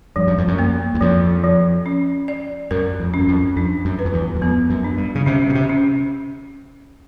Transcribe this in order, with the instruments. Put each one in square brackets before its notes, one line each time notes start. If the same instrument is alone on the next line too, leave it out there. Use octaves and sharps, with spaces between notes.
[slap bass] G2 [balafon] F3
[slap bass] F#2
F2
F#2
[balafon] A#3
[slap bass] E2
[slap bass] F2 [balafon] F3
[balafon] F3
C#4
D5
[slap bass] F#2 [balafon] A#4
[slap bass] F2
[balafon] C#4
[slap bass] F#2
F2
[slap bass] F2 [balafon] D4
[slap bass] F#2
[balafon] B4
[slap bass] F2
E2
F#2
[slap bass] F2 [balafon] B3
[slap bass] F#2
[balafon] D4
[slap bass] G2
C#3
[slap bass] C3 [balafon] C#4
[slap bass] B2
C3
[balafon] C#4